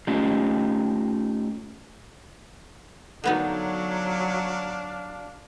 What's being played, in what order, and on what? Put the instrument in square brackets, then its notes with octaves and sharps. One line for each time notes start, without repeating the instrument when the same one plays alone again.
[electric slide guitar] A3 C#4 D#4 F4 G4
[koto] D3 B3 D#4 [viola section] F#3 [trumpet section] D4 F5